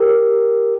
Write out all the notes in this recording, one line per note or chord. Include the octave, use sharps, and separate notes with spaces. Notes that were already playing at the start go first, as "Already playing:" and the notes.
Already playing: G4 A#4